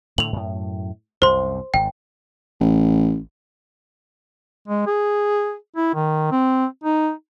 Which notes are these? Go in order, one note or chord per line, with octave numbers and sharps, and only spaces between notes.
A2 D3 A3 F7 F#7
F#2 A2
C2 F#2 C3 C5 C6
G#1 G#2 G5
A1
G#3
G#4
E4
D#3
C4
D#4